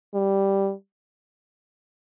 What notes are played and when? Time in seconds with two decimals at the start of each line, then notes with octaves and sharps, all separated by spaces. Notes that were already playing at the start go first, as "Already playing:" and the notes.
0.15 G3